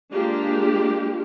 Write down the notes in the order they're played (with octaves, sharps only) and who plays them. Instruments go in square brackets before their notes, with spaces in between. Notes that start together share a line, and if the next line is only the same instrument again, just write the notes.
[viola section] G#3 A#3 D4 F4 G4